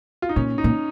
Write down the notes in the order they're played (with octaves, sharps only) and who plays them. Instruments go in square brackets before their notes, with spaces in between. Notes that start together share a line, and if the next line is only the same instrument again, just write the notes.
[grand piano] F4
D#4
[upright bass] A#2 [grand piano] C#4
[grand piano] D#4
[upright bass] A#2